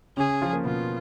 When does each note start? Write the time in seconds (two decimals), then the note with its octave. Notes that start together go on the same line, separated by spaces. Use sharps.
0.17 C#3 C#4 G#4
0.42 F3 F4
0.53 A#3
0.65 B2 B3 F4